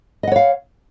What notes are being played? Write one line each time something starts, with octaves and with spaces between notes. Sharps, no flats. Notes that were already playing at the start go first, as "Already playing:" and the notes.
C#5 D#5 F5 F#5